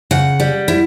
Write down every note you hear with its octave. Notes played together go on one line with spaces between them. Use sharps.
C#3 F#5
G3
E4